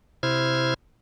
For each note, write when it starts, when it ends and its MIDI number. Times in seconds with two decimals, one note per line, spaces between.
0.23 0.74 48
0.23 0.74 64
0.23 0.74 72
0.23 0.74 89
0.23 0.74 92